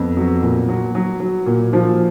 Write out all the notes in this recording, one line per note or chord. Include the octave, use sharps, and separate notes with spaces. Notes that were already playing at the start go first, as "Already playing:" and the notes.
Already playing: F2 B3
F#3
A#2
F#3
F#3
F#3
A#2
F3